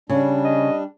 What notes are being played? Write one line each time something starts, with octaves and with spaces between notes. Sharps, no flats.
C#3 G3 D4
D#5